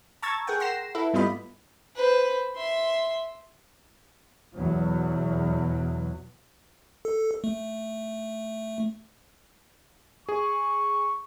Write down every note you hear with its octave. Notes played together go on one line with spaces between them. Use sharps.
A5 A#5 C#6 E6 G#6 A6
G#4 A#4 F#5 G5
F#5 C6 A#6 C7 E7
E4 A4 B4 E5
G#2 G3 B3 F4 D#5 B5
B4 C5
E5 C6
E2 B2 F#3
A4
A3
G#4 C#6